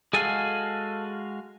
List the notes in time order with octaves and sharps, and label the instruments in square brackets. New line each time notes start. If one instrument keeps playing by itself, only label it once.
[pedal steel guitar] G#3 F#4 F5 [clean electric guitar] G#4 A4 G#5